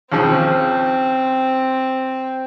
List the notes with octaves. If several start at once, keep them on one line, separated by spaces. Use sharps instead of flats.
D#2 C#3 F3 C4